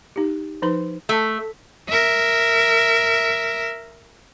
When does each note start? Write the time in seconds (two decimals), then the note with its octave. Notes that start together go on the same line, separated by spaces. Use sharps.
0.16 D#4 G4
0.62 F3 D#4 B4 B5 C6
1.09 A3
1.89 A#4 E5